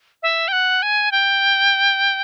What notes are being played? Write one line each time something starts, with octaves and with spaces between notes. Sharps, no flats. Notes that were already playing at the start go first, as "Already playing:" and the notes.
E5
G5
F#5
G#5
G5